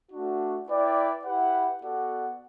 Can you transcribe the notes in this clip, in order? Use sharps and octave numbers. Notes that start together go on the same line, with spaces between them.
A3 D4 F#4
E4 B4 D5 G5
E4 G4 B4 F#5
B3 F#4 A4 D5 F#5